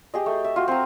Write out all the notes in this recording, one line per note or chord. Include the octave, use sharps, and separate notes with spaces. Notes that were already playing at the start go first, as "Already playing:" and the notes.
G4 G#4 D#5
A3
E5
F4 F#4
C4 A#5